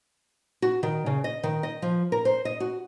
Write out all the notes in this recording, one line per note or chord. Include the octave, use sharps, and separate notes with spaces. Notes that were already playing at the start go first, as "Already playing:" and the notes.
F#4
D#3
C#3
D#5
D#3
D#5
F3
A#4
C5
D#5
F#4